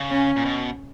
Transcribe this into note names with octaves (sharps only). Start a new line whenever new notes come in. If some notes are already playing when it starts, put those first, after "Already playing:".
Already playing: C#3
C#4
A#2
B2